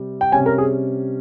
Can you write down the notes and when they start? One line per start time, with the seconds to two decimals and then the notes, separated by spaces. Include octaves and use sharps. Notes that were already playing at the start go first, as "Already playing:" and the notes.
Already playing: C3 G3
0.21 G5
0.32 C3 G3 C#4 G#5
0.46 A#4
0.58 G#4